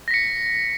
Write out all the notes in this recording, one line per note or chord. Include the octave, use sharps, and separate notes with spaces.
A#6 B6 C#7